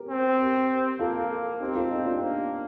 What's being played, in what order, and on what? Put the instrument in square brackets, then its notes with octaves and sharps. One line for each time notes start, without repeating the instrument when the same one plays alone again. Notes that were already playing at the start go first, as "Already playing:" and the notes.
Already playing: [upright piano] G4 A#4
[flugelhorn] C4
[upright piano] G4 A#4
[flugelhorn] A#3 [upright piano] F4 A4
[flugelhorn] C4 [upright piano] D#4 G4
[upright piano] F4 A4
D#4 G4
D4 F4
[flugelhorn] A#3